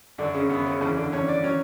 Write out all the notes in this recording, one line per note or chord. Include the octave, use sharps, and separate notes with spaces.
F#2 D3 D4
C#3 C#4
F#2 B3
C#3 C#4
E2 C#3 C#4
D3 D4
E2 C#4 C#5
D4 D5
F#3 C#4 C#5